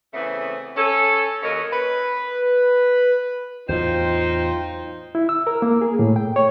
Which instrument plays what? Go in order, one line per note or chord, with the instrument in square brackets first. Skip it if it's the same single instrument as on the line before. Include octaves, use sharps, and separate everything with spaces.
[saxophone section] C#3 E3 A3 B3 C4
C#4 A4
D#2 F#3 C#4 D#4 A#4 D#5
[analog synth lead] B4
[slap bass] E2 A2 F#3 [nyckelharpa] D#4 [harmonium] F4 G5 [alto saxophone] C5
[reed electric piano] E4
E6
A#4
A#3
G#4
A2
G5
C#5